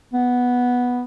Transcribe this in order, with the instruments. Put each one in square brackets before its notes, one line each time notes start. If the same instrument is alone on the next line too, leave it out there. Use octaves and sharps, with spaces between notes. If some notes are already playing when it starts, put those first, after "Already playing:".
[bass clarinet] B3